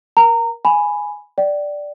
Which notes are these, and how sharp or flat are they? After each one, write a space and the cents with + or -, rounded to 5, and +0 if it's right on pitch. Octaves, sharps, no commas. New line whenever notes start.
A#4 +20 A#5 -20
G#5 +0 B5 +0
D5 +0 G5 -30